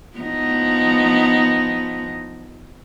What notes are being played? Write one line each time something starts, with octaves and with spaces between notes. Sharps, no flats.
F3 B3 D#4